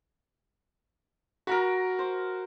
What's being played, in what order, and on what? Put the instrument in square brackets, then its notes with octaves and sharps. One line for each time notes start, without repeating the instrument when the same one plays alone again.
[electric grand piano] F#4 [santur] A#4 A#5 B5
[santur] C5